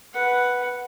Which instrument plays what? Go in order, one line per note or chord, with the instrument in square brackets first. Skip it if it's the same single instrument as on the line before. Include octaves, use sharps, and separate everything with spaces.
[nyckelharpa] B4 F#5